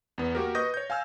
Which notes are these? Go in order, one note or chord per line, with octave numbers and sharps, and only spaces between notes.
E2 B3
A#3 F#4 G4 A#4
B4 D#5 C#6 D#6 G6 A#6
C#5 G6
F5 G#5 E6 F6